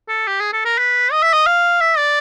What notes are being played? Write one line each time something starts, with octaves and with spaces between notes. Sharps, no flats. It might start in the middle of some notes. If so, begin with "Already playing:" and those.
A4
G4
G#4
A4
A#4
B4
D#5
E5
D#5
F5
E5
D5